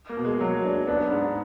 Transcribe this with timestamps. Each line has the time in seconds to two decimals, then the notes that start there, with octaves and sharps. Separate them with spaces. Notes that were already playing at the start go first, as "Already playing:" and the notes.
0.09 A#3
0.17 B2
0.25 G#3
0.41 F#3
0.64 D4
0.87 B3 D4
1.12 G#2